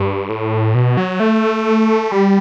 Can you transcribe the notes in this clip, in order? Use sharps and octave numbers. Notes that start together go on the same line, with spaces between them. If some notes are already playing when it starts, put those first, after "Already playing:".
Already playing: G2
A2
B2
F#3
A3
G3